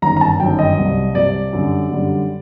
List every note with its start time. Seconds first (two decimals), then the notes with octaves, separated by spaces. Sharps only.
0.02 G1 F#2 D#3 F#3 A#5
0.17 A#5
0.21 A5
0.40 G1 F#2 D#3 F#3 G5
0.59 D#5
0.78 C2 C3 F#3
1.15 C2 C3 F#3 D5
1.53 F#2 D3 G3
1.90 F#2 D3 G3